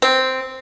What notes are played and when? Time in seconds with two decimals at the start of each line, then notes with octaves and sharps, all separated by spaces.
0.02 C4